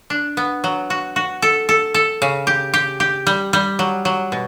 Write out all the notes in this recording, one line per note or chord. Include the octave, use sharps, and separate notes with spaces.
D4
B3
F#3
F#4
F#4
A4
A4
A4
C#3
G4
G4
G4
G3
G3
F#3
F#3
B2